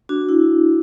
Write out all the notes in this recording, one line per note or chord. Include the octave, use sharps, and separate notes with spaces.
D4 F#4
E4